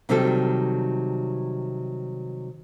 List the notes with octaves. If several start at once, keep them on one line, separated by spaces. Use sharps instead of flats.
C3 D#3 F#3 G3 A4